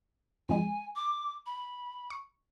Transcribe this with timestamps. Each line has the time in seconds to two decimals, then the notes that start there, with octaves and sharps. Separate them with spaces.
0.49 F2 G#3 G#5
0.96 D6
1.46 B5
2.10 C#6